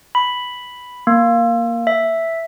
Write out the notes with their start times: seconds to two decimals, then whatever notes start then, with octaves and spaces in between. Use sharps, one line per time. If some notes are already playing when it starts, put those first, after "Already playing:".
0.15 B5
1.07 A#3
1.87 E5